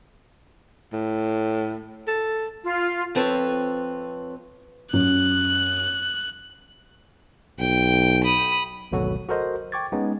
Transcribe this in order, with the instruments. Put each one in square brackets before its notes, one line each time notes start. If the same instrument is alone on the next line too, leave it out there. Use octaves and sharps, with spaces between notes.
[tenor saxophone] A2
A4
[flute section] F4
[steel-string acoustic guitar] F2 C4 A4 B4 C#5
[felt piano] F#2 [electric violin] F#6
[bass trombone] B1 [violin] G5
[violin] B5 D#6
[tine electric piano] G#1 D2 B2 F#3 F#4 A4
F#4 A4 A#4 C5 D#5
G5 C#6 D6 G#6 A6
G#3 B3 C#4 D#4